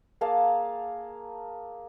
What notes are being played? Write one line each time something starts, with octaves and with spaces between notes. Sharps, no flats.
A#3 G#4 F5 A5